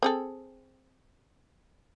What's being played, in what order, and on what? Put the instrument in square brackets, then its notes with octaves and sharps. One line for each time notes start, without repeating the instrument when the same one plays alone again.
[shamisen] C4 G#4 A4